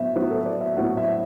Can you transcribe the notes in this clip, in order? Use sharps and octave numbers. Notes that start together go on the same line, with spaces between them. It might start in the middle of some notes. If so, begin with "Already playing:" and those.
Already playing: A2 F#3 B3 E5
A2 F#3 B3 B4
A4
D5
E5
A2 F#3 B3 F#5
E5